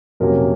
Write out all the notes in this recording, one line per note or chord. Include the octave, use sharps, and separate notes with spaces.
F2 C3 F#3 A#3 C#4 A#4